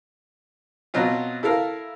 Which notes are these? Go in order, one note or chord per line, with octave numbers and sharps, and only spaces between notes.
B2 F#3 C4 F4
E4 A4 A#4 F5